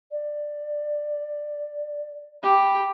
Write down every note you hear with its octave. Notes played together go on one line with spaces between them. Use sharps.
D5
G4 B5